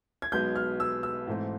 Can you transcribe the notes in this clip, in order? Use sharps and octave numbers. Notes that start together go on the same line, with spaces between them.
G#6
B1 B2 G#3 B3 G6
F6
E6
E6
G#2 E3 A3 C4